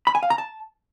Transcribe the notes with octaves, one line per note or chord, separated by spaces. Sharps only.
B5
G#5
F5
A#5
A5